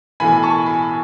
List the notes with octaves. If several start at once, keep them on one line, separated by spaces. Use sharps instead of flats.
B1 A2 E3 G#5 B5
A5 C#6
G#5 B5